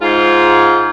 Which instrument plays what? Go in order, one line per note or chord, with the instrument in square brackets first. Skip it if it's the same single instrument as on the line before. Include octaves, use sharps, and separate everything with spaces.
[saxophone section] G#2 F4